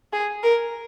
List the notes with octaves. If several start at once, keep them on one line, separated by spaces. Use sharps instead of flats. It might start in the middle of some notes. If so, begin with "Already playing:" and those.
G#4
A#4